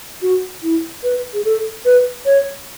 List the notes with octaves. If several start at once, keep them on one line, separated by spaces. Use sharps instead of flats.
F#4
E4
B4
G#4
A4
B4
C#5